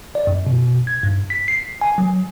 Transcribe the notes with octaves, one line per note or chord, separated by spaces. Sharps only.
D5
F#2
B2
G#6
G2
B6
C7
G#5
F#3